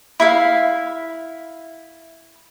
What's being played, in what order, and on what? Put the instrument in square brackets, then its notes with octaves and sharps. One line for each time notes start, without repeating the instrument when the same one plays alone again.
[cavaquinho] E4 E5 F5